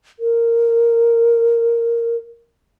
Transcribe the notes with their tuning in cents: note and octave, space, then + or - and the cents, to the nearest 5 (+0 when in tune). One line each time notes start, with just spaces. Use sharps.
A#4 -5